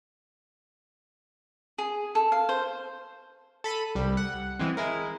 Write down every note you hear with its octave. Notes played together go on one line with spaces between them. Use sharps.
G#4
A4
F5
C5
A4 B5 B6 D#7
C2 G3
F#5
E3 G#3 C4
G#3 E4 A#4